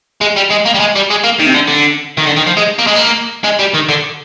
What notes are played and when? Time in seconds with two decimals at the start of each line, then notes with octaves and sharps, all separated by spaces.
0.21 G#3
0.36 G3
0.50 G#3
0.65 A#3
0.74 G3
0.80 G#3
0.95 G3
1.10 G#3
1.24 A#3
1.39 D#3
1.46 C3
1.54 D3
1.68 D3
2.17 D#3
2.26 D3
2.36 D#3
2.46 F3
2.57 G#3
2.79 A#3
2.87 G#3
2.96 A#3
3.44 G#3
3.59 G3
3.74 D#3
3.89 D3